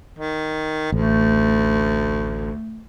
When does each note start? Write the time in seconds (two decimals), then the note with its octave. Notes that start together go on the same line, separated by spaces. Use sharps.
0.19 D#3
0.92 A1 D2 A3